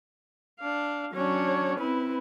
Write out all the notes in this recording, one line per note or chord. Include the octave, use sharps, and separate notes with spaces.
D4 F5
F#3 C#4 D4 C#5
C4 E4 B4